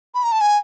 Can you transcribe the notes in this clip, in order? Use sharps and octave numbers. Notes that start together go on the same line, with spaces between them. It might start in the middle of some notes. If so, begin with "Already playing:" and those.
B5
A#5
A5
G#5